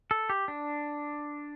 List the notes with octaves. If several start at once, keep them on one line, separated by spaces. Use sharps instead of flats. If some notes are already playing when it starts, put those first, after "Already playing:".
A4
G4
D4